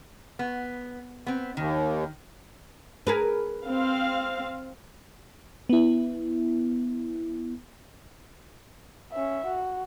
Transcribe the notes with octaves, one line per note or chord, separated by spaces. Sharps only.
B3
B3 C4
D#2 D#3
G#4 A#4 B4
C4 F5
B3 E4
C#4 E5
F#4